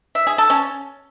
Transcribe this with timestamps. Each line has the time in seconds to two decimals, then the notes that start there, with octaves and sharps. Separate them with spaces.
0.15 E5
0.27 G#4
0.38 A4
0.50 C#4